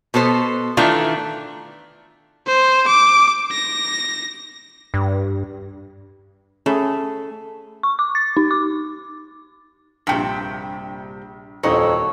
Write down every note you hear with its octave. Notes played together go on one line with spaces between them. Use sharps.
B2 B3 A4 C5
D#3 E3 A3 D4 F4
C5
D6
A#6
G2
A3 C#4 G#4 B5
C#6
D6
A6
D#4
D6
A#1 G2 C3 G5 B6
D#1 F2 F#3 D#4 A4 C#5 D5 C#7